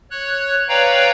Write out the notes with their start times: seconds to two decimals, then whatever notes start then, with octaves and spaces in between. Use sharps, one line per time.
0.11 C#5 F#6
0.68 B4 C#5 D5 F5 G5 A#5